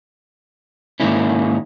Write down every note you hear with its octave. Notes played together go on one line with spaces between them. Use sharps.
G#2 D#3 A#3 C#4 E4